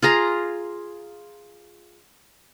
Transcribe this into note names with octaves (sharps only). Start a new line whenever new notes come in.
F4 G#4 A#5